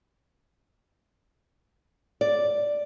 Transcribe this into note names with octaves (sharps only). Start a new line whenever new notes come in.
D5